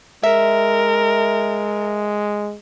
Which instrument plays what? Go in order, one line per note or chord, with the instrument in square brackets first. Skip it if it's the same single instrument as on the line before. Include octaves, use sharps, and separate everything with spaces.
[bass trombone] G#3 [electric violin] A#4 [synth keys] E5